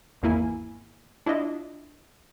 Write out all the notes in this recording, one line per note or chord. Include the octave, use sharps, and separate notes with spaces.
G#1 E2 A#3 E4 G#5
D4 E4 F4 D#5 E5